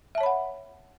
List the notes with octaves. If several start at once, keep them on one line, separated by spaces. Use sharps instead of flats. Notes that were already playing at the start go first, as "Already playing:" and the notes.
C#5 E5 F#5 A5 B5